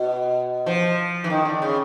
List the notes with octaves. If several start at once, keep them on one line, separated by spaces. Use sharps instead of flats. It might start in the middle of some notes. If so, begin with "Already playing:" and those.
Already playing: B2
F3
E3
D#3
D3
C#3